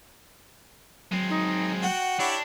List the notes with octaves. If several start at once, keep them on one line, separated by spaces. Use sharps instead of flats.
F#3 G#3 C4
D#4
F#4 F#5 G5
D4 E4 G4 C#5